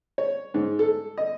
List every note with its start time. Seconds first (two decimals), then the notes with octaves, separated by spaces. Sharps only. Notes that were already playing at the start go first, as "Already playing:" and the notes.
0.18 C#5
0.54 G#2
0.79 A4
1.18 D#5